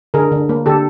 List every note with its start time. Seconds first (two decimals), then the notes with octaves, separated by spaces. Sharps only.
0.14 D3 G#4 A#4
0.32 D3
0.49 A#3
0.66 D3 G4 A4